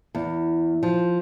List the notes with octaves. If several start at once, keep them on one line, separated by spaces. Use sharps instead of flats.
E2
F3